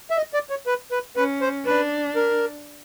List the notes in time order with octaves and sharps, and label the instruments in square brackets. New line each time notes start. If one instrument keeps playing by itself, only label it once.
[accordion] E5
D#5
D5
C#5
B4
B4
[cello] C#4 [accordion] B4
[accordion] C5
[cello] D4 [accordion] B4
[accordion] A#4